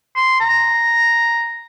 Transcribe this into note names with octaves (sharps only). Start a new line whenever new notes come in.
C6
A#5